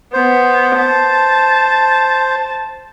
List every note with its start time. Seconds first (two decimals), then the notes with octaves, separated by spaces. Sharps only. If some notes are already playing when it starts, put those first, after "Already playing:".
0.13 B3 C5
0.78 A5